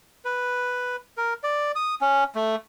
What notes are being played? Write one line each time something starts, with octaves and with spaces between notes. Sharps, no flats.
B4
A#4
D5
D#6
C#4
A3